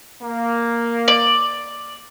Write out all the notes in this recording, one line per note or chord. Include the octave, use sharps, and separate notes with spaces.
A#3
D5